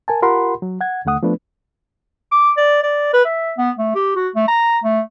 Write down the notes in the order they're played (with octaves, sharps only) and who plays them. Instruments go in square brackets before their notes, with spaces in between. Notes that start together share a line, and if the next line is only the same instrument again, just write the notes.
[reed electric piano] A#4 G#5 A5
F4 G4 A#4 F#5 B5 C6
F#3
F#5 G#6
D#2 D3 A3 F#5 D#6
F3 A3 B3 D4 B4
[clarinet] D6
D5
D5
B4
E5
B3
A3
G4
F#4
A3
A#5
A3